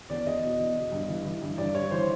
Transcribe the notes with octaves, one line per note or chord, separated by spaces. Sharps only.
E2 D5
E2 D#5
B2
E2
B2
G2
E3
E3
G2
G2 D5
G2 C#5
E3 C5